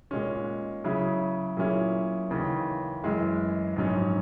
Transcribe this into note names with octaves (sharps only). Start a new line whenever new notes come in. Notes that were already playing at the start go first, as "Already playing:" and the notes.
A#2 G#3 C#4
C#3 F#3 C#4 E4 G#4
A#2 F#3 C#4 E4 G#4
D#2 C#3 E3
F#2 E3 G#3
A#1 G#2 F#3 C#4